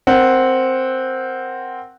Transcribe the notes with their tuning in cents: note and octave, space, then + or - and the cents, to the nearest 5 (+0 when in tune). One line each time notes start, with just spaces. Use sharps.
C4 +0 A#4 +0 F#5 +0